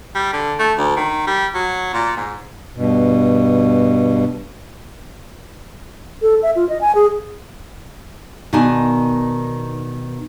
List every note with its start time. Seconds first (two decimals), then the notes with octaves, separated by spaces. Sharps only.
0.15 G3
0.33 D3
0.59 A3
0.78 D2
0.97 D#3
1.27 G3
1.55 F#3
1.93 A#2
2.17 G#2
2.75 G2 B2
6.22 A4
6.43 E5
6.56 F4
6.69 D#5
6.81 G#5
6.95 G#4
8.53 B2 D#3 D#4 D5 G#5 A5